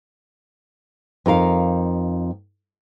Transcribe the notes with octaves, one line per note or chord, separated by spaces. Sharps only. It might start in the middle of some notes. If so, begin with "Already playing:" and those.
F2 D#4 A#4 F5